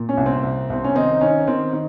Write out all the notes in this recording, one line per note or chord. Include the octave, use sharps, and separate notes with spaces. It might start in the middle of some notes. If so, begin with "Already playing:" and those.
Already playing: A#2
C#4
C2
C4
C2
C2 C4
C#4
D#3 C4 D#4
D#3 C#4
D#3 C4
D#3